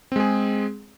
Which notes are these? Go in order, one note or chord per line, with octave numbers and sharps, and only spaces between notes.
G#3 C4 G#4